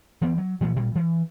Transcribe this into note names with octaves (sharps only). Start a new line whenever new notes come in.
E3 B3 C4
F#3
A#2 E3 A3
A1 A#2 G3
E3